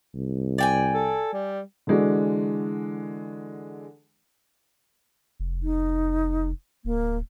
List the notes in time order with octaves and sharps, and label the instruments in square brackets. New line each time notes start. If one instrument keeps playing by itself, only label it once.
[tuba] C2
[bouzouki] D5 G5 G#5
[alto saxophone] A4
G3
[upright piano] D3 E3 G#3 D4 F#4
[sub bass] F1
[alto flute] D#4
[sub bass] D1 [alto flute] A#3